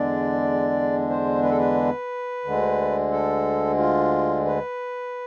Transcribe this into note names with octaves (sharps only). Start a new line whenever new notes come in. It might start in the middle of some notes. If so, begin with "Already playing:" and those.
Already playing: E2 D3 G#3 D4 D5
C5
B4
A4
B4
D2 D3 G#3
A4
F4
B4